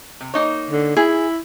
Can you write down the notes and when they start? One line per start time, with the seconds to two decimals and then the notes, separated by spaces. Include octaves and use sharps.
0.21 C3
0.34 A#3 D#4 C#5
0.71 D3
0.97 E4 G#4